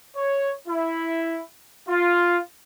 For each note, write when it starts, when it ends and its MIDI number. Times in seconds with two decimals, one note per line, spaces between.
0.14 0.49 73
0.67 1.39 64
1.87 2.37 65